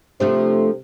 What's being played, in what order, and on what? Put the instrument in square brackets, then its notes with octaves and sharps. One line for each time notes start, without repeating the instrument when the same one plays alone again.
[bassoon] C3 [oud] F3 A3 D4